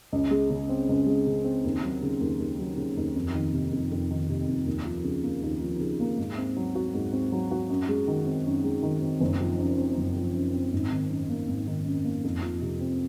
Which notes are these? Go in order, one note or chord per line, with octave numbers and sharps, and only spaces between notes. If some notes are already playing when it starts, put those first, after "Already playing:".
C#2
G#3
C#3
C4
C#2
G#3
C#3
C4
D#2
F#3
C#3
D#2
D#2
F#3
C#3
D#2
F2
D#3
C3
F2
F2
D#3
C3
F2
D#2
F3
C#3
A#3
D#2
F3
C#3
A#3
G#2
C4
F#3
F#4
G#2
C4
F#3
F#4
F#2
G#3
D#3
C4
F#2
G#3
D#3
C4
F#1
F3
F#2
C4
F#1
F3
F#2
C4
G#1
D#3
F#2
A#3
G#1
D#3
F#2
A#3
F2
F3
C3
C4